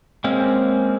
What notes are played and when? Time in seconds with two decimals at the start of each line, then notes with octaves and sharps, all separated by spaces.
0.24 G#3 A#3 C4 C#4